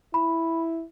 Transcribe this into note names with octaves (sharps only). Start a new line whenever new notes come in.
E4 B5